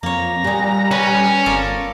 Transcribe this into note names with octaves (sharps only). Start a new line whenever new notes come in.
F2 A#3 C#5 A#5
A#2 G3 G#3
C#4 B4
G1 F4 A4 A#4 D5